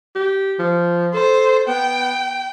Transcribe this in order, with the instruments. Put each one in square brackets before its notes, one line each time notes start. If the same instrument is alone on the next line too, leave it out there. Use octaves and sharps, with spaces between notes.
[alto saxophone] G4
F3
[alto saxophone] A4 [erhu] C5
[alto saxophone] B3 [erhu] G5